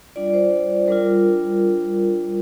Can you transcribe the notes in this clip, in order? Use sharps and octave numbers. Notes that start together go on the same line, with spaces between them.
G3 D4 F4 D5
C5
G3 D4 F4 A#4